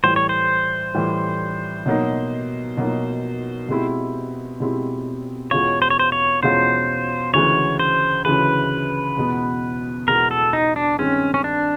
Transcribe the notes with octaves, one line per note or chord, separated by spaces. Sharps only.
A2 E3 G3 C5
C#5
C5
A2 E3 G3
B2 F#3 A#3 D#4
B2 F#3 A#3 D#4
B2 G#3 C4 E4 G4
B2 G#3 C4 E4 G4
E2 B2 G#3 C#4 F4 C#5
C5
C#5
C5
C#5
E2 B2 G#3 C#4 F4 C5
D2 C#3 E3 G#3 C#5
C5
D2 C#3 E3 G#3 B4
E2 B2 G#3 B3
E2 B2 G#3 B3 A#4
A4
D#4
D4
G2 D#3 G#3 C4 C#4
C#4
D4